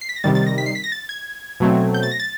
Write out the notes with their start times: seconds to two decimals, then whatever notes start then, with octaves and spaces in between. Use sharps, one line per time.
0.01 C7
0.09 B6
0.16 A#6
0.24 C3 D#3 G3 A6
0.35 A6
0.46 A#6
0.58 B6
0.66 C7
0.75 B6
0.84 A#6
0.92 A6
1.09 G#6
1.60 B2 F#3 A3 C4
1.94 G6
2.03 A6
2.11 A#6
2.20 A6